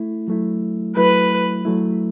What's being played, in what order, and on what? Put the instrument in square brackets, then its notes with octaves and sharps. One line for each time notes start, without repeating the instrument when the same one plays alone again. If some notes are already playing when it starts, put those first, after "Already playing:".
Already playing: [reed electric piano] A3 E4
F#3 A3 E4
[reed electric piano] F#3 A3 E4 [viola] B4
[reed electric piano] F#3 A3 E4